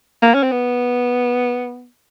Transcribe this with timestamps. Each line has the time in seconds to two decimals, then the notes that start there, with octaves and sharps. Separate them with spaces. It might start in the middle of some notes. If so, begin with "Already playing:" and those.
0.22 A#3
0.34 C#4
0.43 C4
0.52 B3